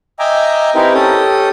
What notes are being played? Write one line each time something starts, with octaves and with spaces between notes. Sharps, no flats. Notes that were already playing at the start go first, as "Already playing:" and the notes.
D#5 E5 G5 G#5 A#5 D6
C4 D#4 E4 G4 A#4 B4
C#4 G4 A4 D#6